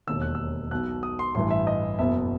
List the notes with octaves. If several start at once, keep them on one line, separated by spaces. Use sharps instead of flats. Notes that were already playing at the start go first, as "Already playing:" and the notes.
E1 D#2 D#3 E6
F#6
E6
B1 B2 F#6
D#6
C6
A1 G2 E3 C6
E5
D#5
F#1 E2 B2 E5